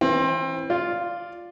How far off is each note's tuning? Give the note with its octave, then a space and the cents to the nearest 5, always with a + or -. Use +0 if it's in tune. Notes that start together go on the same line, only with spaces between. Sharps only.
E3 +0 C4 +30
F4 +0 D5 +0